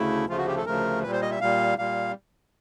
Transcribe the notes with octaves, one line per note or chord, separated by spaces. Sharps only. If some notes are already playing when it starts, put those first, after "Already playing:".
Already playing: D2 C#3 A3 E4
D2 C#3 F3 A3 F4
F#4
G4
A4
D2 C#3 F3 A3 A#4
A#2 G3 B4
C5
D#5
E5
A#2 G3 F5
A#2 G3 F5